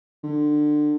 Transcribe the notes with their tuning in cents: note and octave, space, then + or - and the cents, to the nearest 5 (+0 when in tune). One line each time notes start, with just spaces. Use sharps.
D3 +25